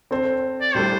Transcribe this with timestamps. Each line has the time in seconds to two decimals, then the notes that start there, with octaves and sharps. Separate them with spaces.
0.11 C4 A4 C5
0.61 D5
0.74 A2 G3 D4 A4 C5